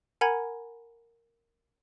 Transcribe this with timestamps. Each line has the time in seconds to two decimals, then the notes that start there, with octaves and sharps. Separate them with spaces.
0.21 A#4 F#5 G#5 A#5 B5 G#6